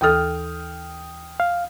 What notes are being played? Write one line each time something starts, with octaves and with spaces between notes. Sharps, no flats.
D#2 E3 A4 G5 D#6 F6
F5